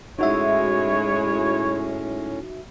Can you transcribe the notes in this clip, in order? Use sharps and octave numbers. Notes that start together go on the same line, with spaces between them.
A2 G#3 C#4 D#4 E4 F#4 C#5 E5